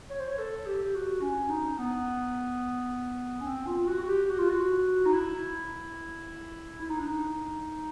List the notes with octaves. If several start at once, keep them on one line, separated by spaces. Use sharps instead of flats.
C#5
C5
C#5
A4
G4
F#4
C#4
D#4
B3
C#4
C4
F4
F#4
F#4
G4
F#4
F4
F#4
D#4
E4
E4
D#4
D4
D#4